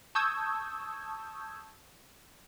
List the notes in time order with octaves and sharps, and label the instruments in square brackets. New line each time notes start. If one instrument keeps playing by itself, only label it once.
[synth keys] A5 C#6 D#6 E6 G6 G#6